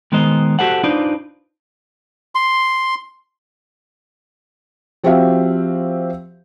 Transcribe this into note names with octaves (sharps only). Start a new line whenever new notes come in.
D#3 G#3 B3 A#4 C5 D#5
F#4 G4 A4 C5 F#5
D4 D#4 F4 B4 C5 D5
C6
F3 C4 F#4 G4 E5 F5